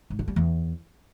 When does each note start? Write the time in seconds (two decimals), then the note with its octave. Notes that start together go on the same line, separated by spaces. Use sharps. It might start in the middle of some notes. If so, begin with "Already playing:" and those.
0.10 G#2
0.19 D3
0.28 G3
0.36 E2